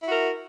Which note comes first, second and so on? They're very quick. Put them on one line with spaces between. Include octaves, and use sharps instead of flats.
E4 F#4 A#4